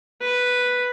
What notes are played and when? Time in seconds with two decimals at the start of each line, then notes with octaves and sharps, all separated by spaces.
0.21 B4